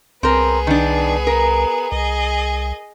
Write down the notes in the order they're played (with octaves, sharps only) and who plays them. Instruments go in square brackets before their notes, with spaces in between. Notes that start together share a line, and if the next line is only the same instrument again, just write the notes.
[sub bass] C2 [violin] B3 G#4 [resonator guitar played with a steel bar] C4 A#4
[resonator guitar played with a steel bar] D#3 D4
A#4
[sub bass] C2 [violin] G#4 D#5